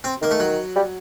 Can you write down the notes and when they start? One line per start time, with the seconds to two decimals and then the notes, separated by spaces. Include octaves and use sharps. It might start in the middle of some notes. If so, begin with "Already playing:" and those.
0.04 C4
0.22 D#3 A#3
0.31 A3
0.40 F#3
0.76 G3